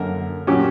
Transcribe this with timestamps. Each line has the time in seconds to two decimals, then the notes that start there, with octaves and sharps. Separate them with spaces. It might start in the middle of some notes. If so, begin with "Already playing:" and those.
Already playing: F#2 D3 A#3 A#4
0.47 A#2 F#3 C#4 G4